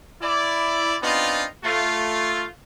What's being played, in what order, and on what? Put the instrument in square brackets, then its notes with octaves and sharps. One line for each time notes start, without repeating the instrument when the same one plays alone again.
[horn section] E4 D5
B3 C4 D4 D#4 F4
A3 F4